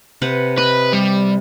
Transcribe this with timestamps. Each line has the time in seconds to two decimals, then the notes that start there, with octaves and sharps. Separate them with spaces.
0.22 C3 B4 F#5
0.58 B4 D#5
0.93 G3